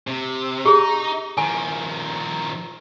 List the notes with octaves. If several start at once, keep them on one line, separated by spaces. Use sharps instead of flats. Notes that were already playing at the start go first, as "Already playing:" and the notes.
C3
D#4 G4 G#4
D#3 F3 G#5